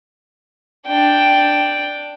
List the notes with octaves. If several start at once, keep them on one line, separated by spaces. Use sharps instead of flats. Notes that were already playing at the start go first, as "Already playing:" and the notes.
D4 G5